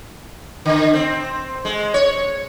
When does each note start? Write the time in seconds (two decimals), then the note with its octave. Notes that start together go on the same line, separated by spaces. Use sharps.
0.66 D3
0.94 C4
1.65 G#3
1.94 C#5